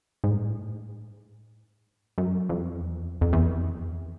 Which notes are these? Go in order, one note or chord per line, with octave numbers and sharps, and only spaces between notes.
G#2
A2
F#2
F2
E2
F2
F2
E2
F2
E2
F2